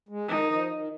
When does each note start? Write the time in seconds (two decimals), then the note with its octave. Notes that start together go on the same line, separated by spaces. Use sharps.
0.09 G#3
0.28 D#3 D#4
0.49 F3
0.70 D#3